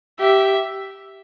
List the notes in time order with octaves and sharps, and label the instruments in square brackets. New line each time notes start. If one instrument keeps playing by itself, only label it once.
[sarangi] G4 [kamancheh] E5